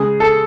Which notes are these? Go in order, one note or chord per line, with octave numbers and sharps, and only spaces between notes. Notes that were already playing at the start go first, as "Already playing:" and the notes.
Already playing: C#3 G#3 G#4
A4